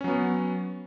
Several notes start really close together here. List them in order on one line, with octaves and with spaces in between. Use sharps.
C#4 F#3 B3